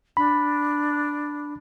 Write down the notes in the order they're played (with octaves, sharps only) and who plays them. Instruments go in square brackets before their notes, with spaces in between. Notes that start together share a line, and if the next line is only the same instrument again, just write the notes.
[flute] D4 [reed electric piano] B5